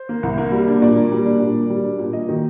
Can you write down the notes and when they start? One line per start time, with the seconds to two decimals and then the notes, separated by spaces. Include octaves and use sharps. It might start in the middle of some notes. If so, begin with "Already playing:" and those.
Already playing: C5
0.09 A#3
0.23 C2
0.38 A#3
0.52 G3
0.68 D4
0.82 A#2 D5
0.97 A#3
1.12 G3
1.26 D4
1.40 A#2
1.55 A#3
1.70 G3
1.84 D4
1.99 A#2
2.13 A#3 D#5
2.29 D#3